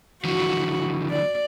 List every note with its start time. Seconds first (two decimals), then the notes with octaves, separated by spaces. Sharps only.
0.25 D3 E3 F3 F#4
1.10 D5